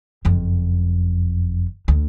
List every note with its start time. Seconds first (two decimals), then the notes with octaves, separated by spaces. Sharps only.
0.25 F#1 F2
1.88 D2